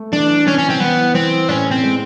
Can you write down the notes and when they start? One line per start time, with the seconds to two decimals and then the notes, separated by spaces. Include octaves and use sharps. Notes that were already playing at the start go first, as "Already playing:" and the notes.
Already playing: A3
0.12 E3 D4
0.46 E3 C#4
0.58 C#4
0.70 C4
0.80 E3 B3
1.14 E3 C4
1.49 A2 C#4
1.71 C4
1.83 G#3